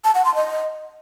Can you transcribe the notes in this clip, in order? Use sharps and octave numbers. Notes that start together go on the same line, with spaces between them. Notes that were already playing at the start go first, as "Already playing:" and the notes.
A5
F#5
C6
D#5